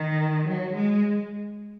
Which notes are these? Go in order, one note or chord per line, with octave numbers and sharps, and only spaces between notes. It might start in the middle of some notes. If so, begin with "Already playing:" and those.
Already playing: D#3
F#3
G#3